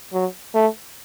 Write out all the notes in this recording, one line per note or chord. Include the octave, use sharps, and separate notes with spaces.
F#3
A3